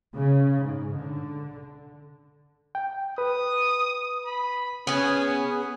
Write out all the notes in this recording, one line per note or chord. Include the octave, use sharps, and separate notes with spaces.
C#3
G#2
D3
G5
B4 D#6
B5
B3 C#4 G#4